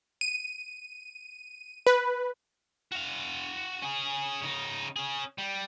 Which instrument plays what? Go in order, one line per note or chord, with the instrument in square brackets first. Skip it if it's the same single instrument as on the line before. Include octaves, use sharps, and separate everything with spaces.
[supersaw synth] D#7
B4
[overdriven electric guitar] F#4 F5
C#4 G#4
C#3 D#4
C#4 G#4
G3